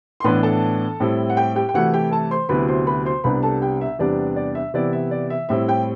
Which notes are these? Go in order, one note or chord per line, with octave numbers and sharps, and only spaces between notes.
C6
A2 E3 B3 D4 B4 B5
A4 A5
A2 G3 C4 E4
F#5
G4 G5
G4 G5
G5
C3 E3 A3 E4 F#4 F#5
G4 G5
A4 A5
C5 C6
D2 C3 F#3 B3 E4 B4 B5
C5 C6
B4 B5
C5 C6
C2 C3 G3 B3 D4 B4 B5
A4 A5
G4 G5
E5
E2 C3 G3 B3 D4 D5
D5
E5
C3 E3 B3 E4 D5
E5
D5
E5
A2 G3 C4 E4 E5
G4 G5